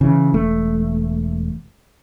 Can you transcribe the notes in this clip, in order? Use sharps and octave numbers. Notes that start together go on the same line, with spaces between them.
C#3 E3
E1 A3